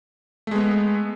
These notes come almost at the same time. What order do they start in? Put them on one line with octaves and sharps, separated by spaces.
A3 G#3 B3